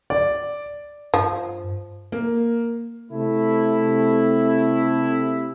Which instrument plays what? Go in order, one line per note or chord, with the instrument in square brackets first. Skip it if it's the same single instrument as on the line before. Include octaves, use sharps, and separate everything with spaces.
[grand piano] D5
[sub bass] G2 [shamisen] F3
[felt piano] A#3
[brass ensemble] C3 A3 E4